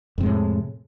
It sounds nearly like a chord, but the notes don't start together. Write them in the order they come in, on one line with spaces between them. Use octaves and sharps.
F2 C3 G#3 A2